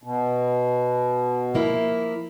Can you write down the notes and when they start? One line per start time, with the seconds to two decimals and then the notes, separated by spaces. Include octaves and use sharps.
0.03 B2
1.54 F3 A#3 E4